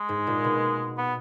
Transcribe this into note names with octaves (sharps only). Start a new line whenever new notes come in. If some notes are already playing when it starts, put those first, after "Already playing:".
Already playing: G#3
G#2
A#2
B2
B3